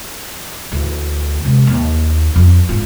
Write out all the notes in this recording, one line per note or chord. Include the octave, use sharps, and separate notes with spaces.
D2 E3
C3 G#3
D#2
F2
G#1 F4